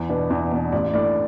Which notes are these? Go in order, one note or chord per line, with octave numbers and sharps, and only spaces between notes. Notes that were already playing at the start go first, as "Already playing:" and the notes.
Already playing: E2
B2 B3 D4
E2
B2 B3 D4
A1 D5
A2 A3 D4 D5